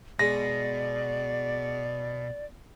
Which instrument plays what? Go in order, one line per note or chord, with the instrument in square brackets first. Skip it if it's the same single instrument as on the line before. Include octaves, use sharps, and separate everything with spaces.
[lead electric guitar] B2 [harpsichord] G#3 [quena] D5 [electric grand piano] A#6